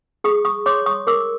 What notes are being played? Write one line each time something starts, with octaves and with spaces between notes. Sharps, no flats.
G#4 C#6 D#6
C#6 D#6
C#5 C6 D6
C#6 D#6
A#4 D6 E6